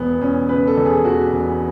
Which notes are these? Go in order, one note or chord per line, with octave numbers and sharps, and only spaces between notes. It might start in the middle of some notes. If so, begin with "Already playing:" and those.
Already playing: E1 B3
E1 C#4
C#3 B4
A4
E2
G#4
E1 F#4
E1